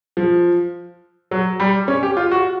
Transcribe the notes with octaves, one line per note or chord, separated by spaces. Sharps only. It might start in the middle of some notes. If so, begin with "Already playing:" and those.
F3
F#3
G3
C#4
G4
F4
F#4